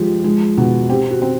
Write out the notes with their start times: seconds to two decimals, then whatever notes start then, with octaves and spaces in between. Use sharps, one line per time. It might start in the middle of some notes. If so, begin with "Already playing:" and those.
Already playing: F3 G#3 G4
0.24 G#3
0.57 B2
0.90 C4 G4
1.11 F#4
1.22 C4